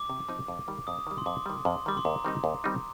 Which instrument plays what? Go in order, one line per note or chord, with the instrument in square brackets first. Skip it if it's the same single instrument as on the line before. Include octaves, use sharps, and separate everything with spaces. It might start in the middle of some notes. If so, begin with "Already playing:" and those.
Already playing: [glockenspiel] D6
[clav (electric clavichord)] C3
F3 C4 D#4
F2
D#3 G3
[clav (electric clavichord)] F2 [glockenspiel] D#6
[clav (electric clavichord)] D#3 G3
[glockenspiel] C6
[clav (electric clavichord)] F2 [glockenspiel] D6
[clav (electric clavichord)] D#3 G3
[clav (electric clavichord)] F2 [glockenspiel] C6
[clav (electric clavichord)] D#3 G3 [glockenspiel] D6
[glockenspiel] C6
[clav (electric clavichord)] D#2 [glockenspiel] A#5
[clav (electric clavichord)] D#3 G3 C4 D#4
D#2
D#3 G3 C4 D#4